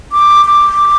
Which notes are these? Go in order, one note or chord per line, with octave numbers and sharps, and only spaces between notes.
D6
D6